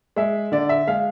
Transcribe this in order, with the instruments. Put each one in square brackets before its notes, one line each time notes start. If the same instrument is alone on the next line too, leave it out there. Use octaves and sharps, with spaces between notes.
[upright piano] G#3 E5
D3 D5
E5
G#3 F5